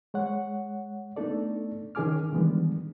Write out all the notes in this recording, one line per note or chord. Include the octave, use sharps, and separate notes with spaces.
G#3 C#5 F#5
A3 B3 D4 D#4 A4 D5
D#3 C#4 G#4 G#5 D6 F6
D#3 E3 G3 G#3 B3 D4